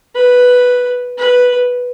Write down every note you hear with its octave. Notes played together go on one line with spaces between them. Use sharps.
B4
B4